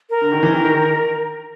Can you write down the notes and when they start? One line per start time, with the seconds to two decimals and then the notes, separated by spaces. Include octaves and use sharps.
0.10 A#4
0.21 D3
0.32 D#3
0.43 E3
0.54 D#3
0.64 D#3